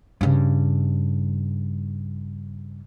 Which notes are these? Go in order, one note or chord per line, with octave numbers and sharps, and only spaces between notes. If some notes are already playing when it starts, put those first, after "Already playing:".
G2 C#3